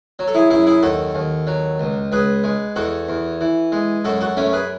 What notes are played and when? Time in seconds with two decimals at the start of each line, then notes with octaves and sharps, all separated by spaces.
0.19 F#3
0.28 A4
0.34 E4 G#4
0.50 F#2 E4 G#4
0.67 E4 G#4
0.83 D#2 F#4 A4
1.15 D#2
1.47 F#3
1.80 C#2
2.12 C#2 G#4 B4
2.44 G#3
2.76 E2 F#4 A4
3.09 E2
3.41 E3
3.72 G#3
4.04 F#2 F#4 A4
4.21 F#4 A4
4.37 F#2 A3 C#4
4.53 G#4 B4